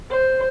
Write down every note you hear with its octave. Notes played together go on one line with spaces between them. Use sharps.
C5